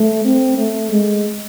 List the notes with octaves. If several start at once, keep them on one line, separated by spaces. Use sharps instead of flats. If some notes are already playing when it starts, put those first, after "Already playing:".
Already playing: A3
C4
A3
G#3